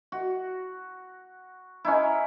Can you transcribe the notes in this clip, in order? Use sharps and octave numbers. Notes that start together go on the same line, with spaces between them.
F#4
C#4 D#4 E4